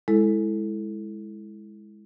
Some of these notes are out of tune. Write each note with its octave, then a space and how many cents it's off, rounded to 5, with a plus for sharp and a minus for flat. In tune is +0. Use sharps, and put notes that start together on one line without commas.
G#3 +0 E4 +0 A4 +0